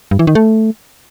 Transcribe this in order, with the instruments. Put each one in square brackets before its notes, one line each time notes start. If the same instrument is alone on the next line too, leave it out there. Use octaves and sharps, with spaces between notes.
[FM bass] G2
E3
D#3
A3